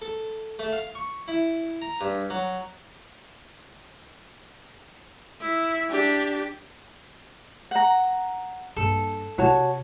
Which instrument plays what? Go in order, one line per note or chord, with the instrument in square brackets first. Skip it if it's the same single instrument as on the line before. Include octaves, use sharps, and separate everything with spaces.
[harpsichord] A4
A3
F5
C#6
E4
A#5
G2
F#3
[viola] E4
D4 G4
[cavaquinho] F#5 A#5
[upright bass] G2 A#3 [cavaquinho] A4
[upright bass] C3 [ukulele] F#4 C#5 A5